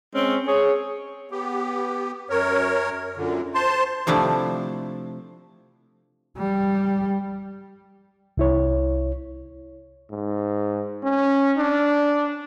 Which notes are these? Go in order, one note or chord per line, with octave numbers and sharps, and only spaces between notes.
G#3 C4 C#4
G#4 C#5
B3 G4
F#2 A#4 C#5
F#2 A#2 D3
C5 A5 C6
C3 F3 A3 D4 E4
G3
C2 E4 C#5
G#2
C#4
D4